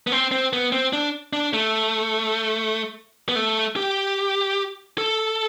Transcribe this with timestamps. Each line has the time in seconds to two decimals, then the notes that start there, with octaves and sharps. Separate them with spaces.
0.07 B3
0.12 C4
0.32 C4
0.53 B3
0.72 C4
0.93 D4
1.33 D4
1.53 A3
3.29 B3
3.36 A3
3.76 G4
4.98 A4